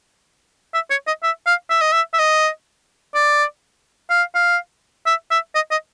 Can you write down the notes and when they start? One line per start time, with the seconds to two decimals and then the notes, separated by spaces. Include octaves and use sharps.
0.74 E5
0.90 C#5
1.07 D#5
1.23 E5
1.46 F5
1.70 E5
1.81 D#5
1.92 E5
2.14 E5
2.19 D#5
3.15 D5
4.10 F5
4.35 F5
5.06 E5
5.31 E5
5.55 D#5
5.71 D#5